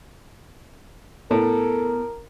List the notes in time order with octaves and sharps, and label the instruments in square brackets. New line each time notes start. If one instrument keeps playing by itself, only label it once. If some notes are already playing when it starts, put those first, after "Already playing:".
[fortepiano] A2 [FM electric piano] B3 [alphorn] A4 [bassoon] A#4